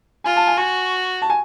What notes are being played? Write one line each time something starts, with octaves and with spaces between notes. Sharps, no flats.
F4 G#5
A5
G#5
F#4 G#5
A5
G#5